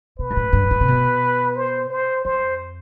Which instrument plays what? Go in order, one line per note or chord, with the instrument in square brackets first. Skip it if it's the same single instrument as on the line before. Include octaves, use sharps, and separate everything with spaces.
[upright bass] B2 [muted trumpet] B4
[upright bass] G2
A2
G2
A2
C3
B2
[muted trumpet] C5
C5
[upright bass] F2 [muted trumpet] C5